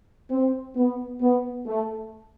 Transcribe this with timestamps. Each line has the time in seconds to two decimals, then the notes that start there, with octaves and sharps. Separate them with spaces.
0.30 C4
0.76 B3
1.21 B3
1.66 A3